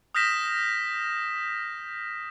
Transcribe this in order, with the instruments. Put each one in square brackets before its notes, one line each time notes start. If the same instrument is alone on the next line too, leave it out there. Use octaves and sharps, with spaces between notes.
[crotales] D#6 F6 G6 A#6 B6 E7